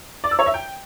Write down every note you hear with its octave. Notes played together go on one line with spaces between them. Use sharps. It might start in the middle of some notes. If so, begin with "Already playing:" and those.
D5
E6
C#5
E5
G5